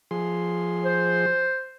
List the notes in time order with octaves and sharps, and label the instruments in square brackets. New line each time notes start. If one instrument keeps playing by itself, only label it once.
[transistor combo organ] F3 G#4 C6
[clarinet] C5